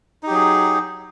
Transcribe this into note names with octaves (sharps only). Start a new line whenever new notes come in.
F#3 D#4 G4 G#4